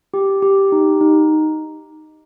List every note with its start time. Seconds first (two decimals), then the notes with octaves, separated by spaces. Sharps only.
0.14 G4
0.42 G4
0.72 D#4
1.01 D#4